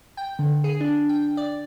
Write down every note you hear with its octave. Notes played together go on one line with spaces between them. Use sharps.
G5
D3
G#4
D4
G5
D5